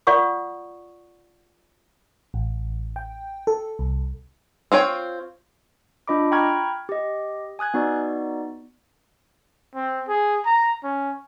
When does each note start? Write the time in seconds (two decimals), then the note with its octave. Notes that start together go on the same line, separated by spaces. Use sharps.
0.07 F4 D5 F#5 C#6 D#6
2.34 A1
2.96 G5
3.47 A4
3.79 C2
4.72 C4 F4 C#5 G5
6.08 D4 F4 D#5 B5 D6
6.31 G5 A#5 B5 C#6 F6 G#6
6.89 G4 D#5
7.59 G#5 D#6 F#6 G#6
7.74 B3 D#4 F#4 D5
9.75 C4
10.09 G#4
10.46 A#5
10.84 C#4